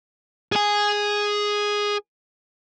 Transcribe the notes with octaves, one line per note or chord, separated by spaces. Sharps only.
G#4 G#5